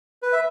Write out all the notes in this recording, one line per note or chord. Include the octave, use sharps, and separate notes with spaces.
B4
E5